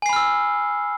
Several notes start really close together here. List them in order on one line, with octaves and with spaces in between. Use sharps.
G#5 C7 B5 F6 E6